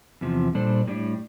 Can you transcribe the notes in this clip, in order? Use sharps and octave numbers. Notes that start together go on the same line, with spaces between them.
E2 C3 F3
A#2 G3 D4 A4 C5
A2 G3 D4